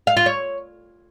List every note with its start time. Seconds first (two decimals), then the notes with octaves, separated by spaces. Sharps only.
0.07 F5
0.17 F4
0.26 C#5